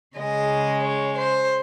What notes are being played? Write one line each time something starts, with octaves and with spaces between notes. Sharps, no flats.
C#3 G#3 D#5
C#5
C5